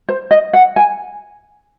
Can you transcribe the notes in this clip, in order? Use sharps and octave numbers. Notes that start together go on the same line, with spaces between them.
C5
D#5
F#5
G#5